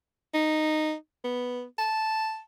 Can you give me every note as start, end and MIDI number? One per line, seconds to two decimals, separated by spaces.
0.34 0.94 63
1.24 1.64 59
1.78 2.40 81